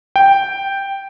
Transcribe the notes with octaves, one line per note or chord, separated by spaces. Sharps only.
G5